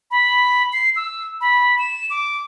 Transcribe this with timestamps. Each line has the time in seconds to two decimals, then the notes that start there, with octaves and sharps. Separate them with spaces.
0.11 B5
0.73 C7
0.96 E6
1.41 B5
1.79 E7
2.10 D6